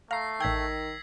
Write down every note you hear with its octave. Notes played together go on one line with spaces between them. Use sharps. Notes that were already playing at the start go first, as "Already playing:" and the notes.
A3 F5 A#5 A#6 C7
A1 D#3 G5 E6 G#6 B6